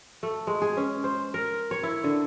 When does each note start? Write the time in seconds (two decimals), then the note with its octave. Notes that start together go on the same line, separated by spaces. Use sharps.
0.23 A3
0.47 G#3
0.62 G#4
0.77 C#4
1.04 C5
1.34 A#4
1.71 C#5
1.83 E4
2.04 D3